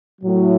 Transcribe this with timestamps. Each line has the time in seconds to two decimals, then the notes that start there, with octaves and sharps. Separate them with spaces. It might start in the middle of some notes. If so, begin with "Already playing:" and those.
0.21 A2 F#3